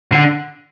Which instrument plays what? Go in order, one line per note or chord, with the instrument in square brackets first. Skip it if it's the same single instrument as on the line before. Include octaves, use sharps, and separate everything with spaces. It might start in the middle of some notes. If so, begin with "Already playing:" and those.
[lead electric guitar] D3